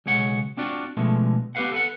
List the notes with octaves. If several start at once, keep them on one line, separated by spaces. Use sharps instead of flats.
B1 C#3 G#3 C#5 F#5
C4 D4 F4 F#4 D5
B2 D3 F3 G#3 A3
B3 G4 A4 B4 F5 F#5
A4 B4 F#5